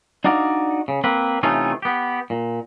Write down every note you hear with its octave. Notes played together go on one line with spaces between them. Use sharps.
D4 D#4 F#4 D5 F5
C#3
A#3 C4 B4
C3 E3 A3 C#4 D#4 F4
B3 G4
A#2